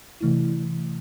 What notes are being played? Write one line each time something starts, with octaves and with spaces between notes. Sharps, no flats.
C3 E3 A3 E4